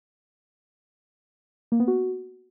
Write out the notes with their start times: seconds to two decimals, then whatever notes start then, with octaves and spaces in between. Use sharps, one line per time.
1.72 A#3
1.80 B3
1.88 F#4